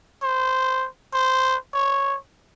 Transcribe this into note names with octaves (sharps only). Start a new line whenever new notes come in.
C5
C5
C#5